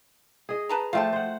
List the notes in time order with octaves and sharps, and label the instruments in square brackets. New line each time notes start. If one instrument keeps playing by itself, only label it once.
[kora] G#4 D#5
[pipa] B4 A5 A#5
[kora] F3 A3 C5 [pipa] F5 G5 A5
[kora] C5 F#5